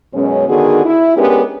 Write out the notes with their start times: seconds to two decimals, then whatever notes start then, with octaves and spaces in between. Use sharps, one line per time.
0.14 F#2 B2 G#3 C#4
0.49 D3 D#3 B3 D#4 F#4 G#4
0.85 E4
1.17 G#3 B3 C#4 D4 G4 A#4